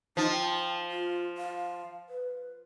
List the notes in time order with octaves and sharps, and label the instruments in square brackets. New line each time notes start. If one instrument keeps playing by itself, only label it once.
[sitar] F3 [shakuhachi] D#4
[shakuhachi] G5
F4
F5
B4